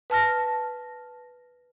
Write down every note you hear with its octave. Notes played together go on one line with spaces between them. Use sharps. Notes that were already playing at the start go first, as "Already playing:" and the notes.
B4 A5 F6 A#6